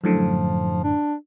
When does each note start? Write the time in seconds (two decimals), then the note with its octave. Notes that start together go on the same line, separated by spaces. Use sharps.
0.04 F#2 A2 D3 F3
0.84 D4